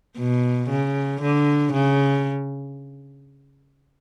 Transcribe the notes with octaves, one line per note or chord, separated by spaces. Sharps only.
B2
C#3
D3
C#3